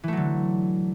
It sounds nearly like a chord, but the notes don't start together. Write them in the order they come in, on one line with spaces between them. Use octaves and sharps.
E3 A3 F#3 D3